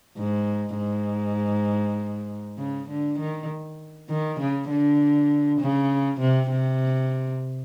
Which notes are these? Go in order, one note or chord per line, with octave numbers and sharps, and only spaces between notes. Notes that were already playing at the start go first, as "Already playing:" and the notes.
G#2
G#2
C#3
D3
D#3
D#3
C#3
D3
C#3
C3
C3